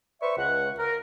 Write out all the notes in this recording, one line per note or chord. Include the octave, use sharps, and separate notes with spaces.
B4 C5 D5 E5 C#6
C#2 F#5
A#4